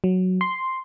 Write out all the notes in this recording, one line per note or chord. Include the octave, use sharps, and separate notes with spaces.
F#3
C6